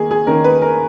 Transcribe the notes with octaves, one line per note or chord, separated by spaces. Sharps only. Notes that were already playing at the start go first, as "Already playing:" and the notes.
Already playing: D#3 A#3 G#4
G#4
D#3 A#3 C#4 A#4
B4
A#4